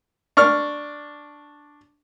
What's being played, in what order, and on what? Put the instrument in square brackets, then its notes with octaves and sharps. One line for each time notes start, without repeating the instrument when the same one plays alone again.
[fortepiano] D4 C#6 F6